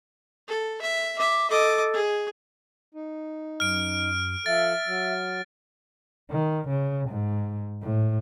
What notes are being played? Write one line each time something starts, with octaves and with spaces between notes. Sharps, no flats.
A4
E5
E5 D6
A4 D#5 D6
G#4
D#4
F#2 F6 D7
F3 A4 E5 A6
F#3
D#3
C#3
G#2
A2